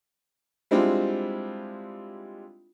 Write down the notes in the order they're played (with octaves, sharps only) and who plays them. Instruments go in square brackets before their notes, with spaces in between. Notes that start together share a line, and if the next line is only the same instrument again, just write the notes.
[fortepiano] G3 G#3 C4 D4 E4 F4